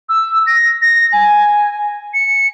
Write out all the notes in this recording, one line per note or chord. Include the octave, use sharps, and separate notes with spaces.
E6
A#6
A#6
G#5
C#7